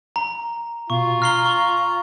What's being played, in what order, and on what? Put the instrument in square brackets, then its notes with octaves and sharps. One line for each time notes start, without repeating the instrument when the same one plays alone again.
[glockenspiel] A#5
[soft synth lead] B2 [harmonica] F4 [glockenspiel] C#6
[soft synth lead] A#5 [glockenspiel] F6 C7 G7
[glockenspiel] C#6